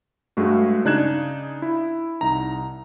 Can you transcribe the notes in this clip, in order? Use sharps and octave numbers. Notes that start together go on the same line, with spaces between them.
G2 G#3 A3 F#4
C#3 D4 D#4 F#6 G#6 E7
E4
C2 D#4 A#5